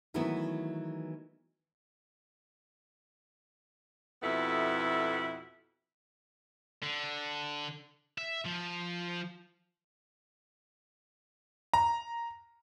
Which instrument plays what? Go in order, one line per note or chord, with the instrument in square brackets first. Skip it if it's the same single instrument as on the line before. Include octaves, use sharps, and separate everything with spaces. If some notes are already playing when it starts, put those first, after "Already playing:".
[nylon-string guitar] D#3 E3 F#3 A3 B3 E4
[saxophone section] F2 B2 B3 E4 A4 E5
[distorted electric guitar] D3
E5
F3
[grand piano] A#5